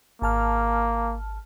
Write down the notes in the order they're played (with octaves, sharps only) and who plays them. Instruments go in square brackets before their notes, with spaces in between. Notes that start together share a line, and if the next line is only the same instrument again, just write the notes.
[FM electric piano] G#1 A5 F6 [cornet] A#3